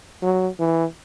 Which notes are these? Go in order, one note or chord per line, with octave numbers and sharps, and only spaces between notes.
F#3
E3